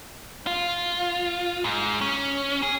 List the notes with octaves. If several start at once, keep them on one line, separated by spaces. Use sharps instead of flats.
F4
G#2
C#4
G#4